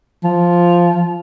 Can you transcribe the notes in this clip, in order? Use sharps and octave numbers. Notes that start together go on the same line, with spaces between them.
F3